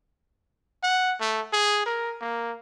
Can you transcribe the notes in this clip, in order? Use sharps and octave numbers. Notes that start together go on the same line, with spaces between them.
F#5
A3
G#4
A#4
A#3